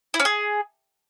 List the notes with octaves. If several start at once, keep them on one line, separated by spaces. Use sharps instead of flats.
E4
C#4
G#4